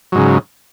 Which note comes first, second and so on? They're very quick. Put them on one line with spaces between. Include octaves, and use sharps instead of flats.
F#3 G#2 C#3